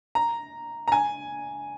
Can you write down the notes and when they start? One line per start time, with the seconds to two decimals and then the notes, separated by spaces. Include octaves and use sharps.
0.15 A#5
0.88 A#5
0.92 G#5